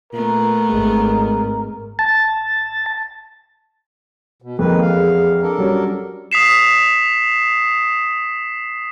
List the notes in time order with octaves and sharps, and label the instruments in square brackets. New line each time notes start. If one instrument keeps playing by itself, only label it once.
[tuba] A#2 [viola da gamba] A3 B3 [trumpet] A#4
[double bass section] G#1 [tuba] G#3
[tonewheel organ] A5
[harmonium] B2
[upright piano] F2 G#3 A#3 [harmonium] D#3 B4
[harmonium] E2 F5
D4 A4 A#4
[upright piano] F#3 G3 C#4
[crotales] D#6 B6 C7 E7